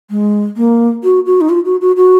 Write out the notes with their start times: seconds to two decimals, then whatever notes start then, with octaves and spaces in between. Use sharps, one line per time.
0.10 G#3
0.56 A#3
1.04 F#4
1.26 F#4
1.41 D#4
1.49 F4
1.65 F#4
1.81 F#4
1.96 F#4